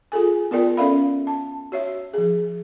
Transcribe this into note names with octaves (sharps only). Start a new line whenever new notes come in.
F4 G#4 A4 G#5
B3 F4 A#4 D5 G5
C#4 A4 D5 E5 F5 B5
A5
F#4 C#5 E5
F3 G#4